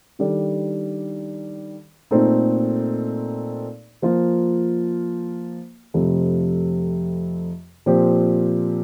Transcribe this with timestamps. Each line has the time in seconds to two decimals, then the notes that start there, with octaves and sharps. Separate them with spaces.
0.19 D#3 G3 D4 A4 D5
2.11 A#2 A3 C4 D#4 A4
4.02 F3 A#3 F4 C5
5.94 F2 C3 F3 A3
7.86 A#2 F3 C4 G4